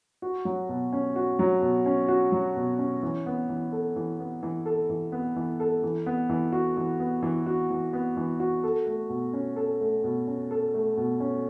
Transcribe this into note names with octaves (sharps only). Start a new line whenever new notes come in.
F#4
F#3
B2
C#4
F#4
F#3
B2
C#4
F#4
F#3
B2
C#4
E3
B3
E3
A4
E3
B3
E3
A4
E3
B3
E3
A4
E3
B3
E3
F#4
E3
B3
E3
F#4
E3
B3
E3
F#4
A4
A3
B2
C#4
A4
A3
B2
C#4
A4
A3
B2
C#4